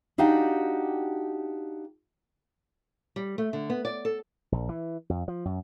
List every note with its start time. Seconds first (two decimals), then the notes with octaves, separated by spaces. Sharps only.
0.18 D4 D#4 F#4 G4 F5 F#5
3.16 G3
3.38 A3
3.53 D3
3.70 B3
3.85 D5
4.05 A4
4.52 A#1
4.69 E3
5.10 F2
5.28 F3
5.45 F#2